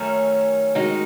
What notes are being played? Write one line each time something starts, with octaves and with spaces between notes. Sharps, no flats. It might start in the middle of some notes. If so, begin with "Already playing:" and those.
Already playing: F#2 D#3 A3 C#4
D#3 G#3 D#4 F#4